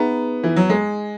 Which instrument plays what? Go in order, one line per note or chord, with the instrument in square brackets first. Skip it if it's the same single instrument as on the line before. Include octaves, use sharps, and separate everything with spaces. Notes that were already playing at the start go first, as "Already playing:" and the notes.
Already playing: [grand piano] B3 [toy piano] D#4 G#4 B4 E5 A#5
[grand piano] E3
F#3
G#3